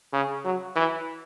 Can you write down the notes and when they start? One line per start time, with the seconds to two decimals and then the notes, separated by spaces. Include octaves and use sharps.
0.13 C#3
0.45 F#3
0.76 E3